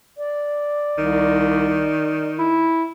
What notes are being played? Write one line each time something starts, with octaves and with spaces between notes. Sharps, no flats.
D5
C2 D#3
E4